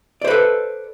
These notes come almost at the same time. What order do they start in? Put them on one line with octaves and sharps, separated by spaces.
D5 C5 B4 A4